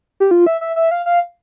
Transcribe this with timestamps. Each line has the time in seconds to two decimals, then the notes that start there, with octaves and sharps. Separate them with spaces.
0.20 G4
0.31 F4
0.46 E5
0.61 E5
0.76 E5
0.91 F5
1.06 F5